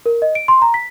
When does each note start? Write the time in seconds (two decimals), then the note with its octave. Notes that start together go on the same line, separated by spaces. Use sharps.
0.06 A#4
0.22 D#5
0.35 D7
0.48 C6
0.62 A#5
0.74 B6